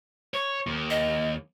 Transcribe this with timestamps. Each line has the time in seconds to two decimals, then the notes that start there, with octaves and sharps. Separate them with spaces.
0.34 C#5 C#6
0.67 D#2
0.90 D#5